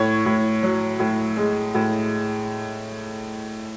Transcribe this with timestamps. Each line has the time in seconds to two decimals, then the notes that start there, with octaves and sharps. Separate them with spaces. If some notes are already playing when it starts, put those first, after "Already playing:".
Already playing: A2 C#5
0.26 A2
0.63 F#3
0.99 A2
1.37 G#3
1.75 A2